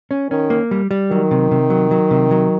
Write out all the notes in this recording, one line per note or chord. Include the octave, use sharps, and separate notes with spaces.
C#4
D#3 C#4
A#3
G3
G3
D#3 F#3
C3
C3
F#3
F#3
C3
F#3